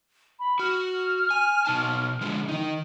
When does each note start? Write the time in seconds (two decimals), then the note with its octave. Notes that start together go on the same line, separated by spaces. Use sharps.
0.39 B5
0.59 F#4 F6
1.30 G#5
1.65 B2 D#4 A5
2.21 D3 F3 G#3
2.48 D#3 D#4